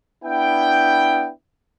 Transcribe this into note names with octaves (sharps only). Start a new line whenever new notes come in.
B3 D4 E4 G5